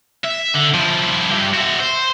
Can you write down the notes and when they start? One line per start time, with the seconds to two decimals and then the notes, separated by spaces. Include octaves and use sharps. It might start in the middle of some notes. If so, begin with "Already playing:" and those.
0.25 E5
0.55 D3
0.74 F3 E4
1.31 G2 G4
1.54 F#4 E5
1.80 C5